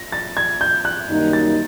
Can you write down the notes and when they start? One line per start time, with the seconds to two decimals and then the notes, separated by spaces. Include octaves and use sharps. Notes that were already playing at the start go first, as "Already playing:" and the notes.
Already playing: A#6
0.12 A6
0.37 G#6
0.61 G6
0.85 F#6
1.09 F#2 D#3 G3 A#3 D#4
1.33 A6